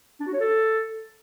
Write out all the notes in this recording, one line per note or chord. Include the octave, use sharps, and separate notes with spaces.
D4
F#4
C#5
A4